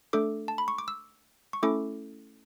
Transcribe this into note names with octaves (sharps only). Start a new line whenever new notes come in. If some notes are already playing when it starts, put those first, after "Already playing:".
A3 D4 A4 D6
A5
B5
C#6
D6
E6
C#6
A3 C#4 E4 A4 D6